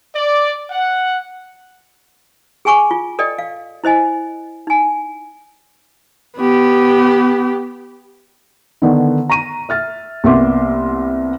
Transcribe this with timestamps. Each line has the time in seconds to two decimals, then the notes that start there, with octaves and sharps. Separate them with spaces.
0.14 D5
0.70 F#5
2.65 G#4 G5 G#5 C#6 D6
2.91 F4
3.19 A4 D5 D#5 G5
3.39 F5
3.84 E4 C5 D#5 G#5
4.67 D#4 G#5
6.37 B3 G4
8.82 D3 D#3 B3
9.29 A#5 C#6 D#7
9.69 E5 F6 A6
10.24 C2 A#3 B3 E5 C6 D6